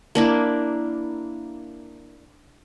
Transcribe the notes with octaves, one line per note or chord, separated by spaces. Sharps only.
A#3 D4 E4